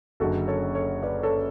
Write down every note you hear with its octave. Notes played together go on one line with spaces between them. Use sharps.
F#1 F#2 D3 F#4 A4
A4 C#5
A4 C#5
B4 D5
A4 C#5